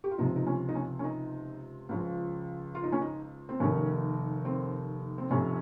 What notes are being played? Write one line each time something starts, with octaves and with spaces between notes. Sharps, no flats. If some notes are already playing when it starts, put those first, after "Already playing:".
G4
F4
C#2 C3 F3 D#4
D#4
C#4
D#4
C#4
C#4
D#4
C#2 C#3 F3
F4
D#4
C#4
D#4
C4
F1 D#2 D#3 C#4
C4
C4
F1 F2 C3 C#4